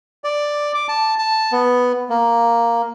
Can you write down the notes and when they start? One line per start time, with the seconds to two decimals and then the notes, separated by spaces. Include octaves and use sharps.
0.24 D5
0.74 D6
0.89 A5
1.19 A5
1.52 B3
2.10 A#3